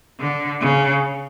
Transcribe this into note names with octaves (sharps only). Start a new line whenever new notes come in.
D3
C#3